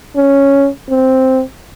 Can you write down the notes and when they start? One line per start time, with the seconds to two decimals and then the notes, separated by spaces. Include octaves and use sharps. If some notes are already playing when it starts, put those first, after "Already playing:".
0.16 C#4
0.90 C4